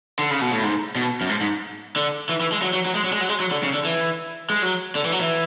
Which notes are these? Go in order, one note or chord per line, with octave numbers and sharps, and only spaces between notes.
D3
C#3
B2
A2
G#2
B2
F#2
G#2
G#2
D3
E3
E3
G#3
F#3
F#3
F#3
G#3
F#3
G#3
F#3
G#3
F#3
D3
C#3
D3
E3
G#3
F#3
D3
E3
F#3
E3